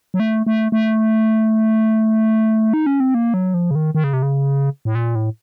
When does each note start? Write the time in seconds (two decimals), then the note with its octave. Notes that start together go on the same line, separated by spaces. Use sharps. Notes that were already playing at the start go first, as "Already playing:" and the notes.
0.14 F#3
0.20 A3
0.46 A3
0.72 A3
2.74 D#4
2.86 C#4
3.00 C4
3.14 A#3
3.34 F#3
3.54 F3
3.71 C#3
3.75 D#3
3.95 D#3
4.04 C#3
4.13 C3
4.23 C#3
4.85 A2
4.95 A#2
5.15 A2